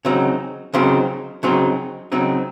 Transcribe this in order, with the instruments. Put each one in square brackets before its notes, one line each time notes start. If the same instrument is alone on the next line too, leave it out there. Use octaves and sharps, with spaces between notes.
[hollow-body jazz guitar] C#3 F#3 C4 D#4
C#3 F#3 C4 D#4
C#3 F#3 C4 D#4
C#3 F#3 C4 D#4